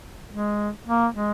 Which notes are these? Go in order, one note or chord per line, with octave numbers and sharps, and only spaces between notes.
G#3
A#3
G#3